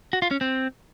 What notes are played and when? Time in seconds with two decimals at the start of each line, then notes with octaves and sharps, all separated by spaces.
0.13 F#4
0.22 F4
0.31 C#4
0.41 C4